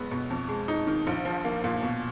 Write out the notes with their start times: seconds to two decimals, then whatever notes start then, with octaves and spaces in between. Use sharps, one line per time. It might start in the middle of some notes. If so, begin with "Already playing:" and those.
Already playing: B1 G#3 B3
0.11 B2
0.30 F2
0.49 G#3
0.68 D#4
0.87 D#3
1.07 A#1
1.25 F3
1.44 A#3
1.64 A#2
1.82 B2